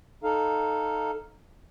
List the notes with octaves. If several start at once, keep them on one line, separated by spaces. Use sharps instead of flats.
D#4 A4 F5